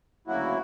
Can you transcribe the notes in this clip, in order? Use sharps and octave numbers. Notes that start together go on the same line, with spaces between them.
D2 C#3 F#3 A#3 E4 F#4